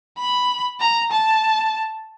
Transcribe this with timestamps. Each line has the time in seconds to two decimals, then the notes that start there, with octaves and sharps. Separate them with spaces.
0.18 B5
0.80 A#5
1.11 A5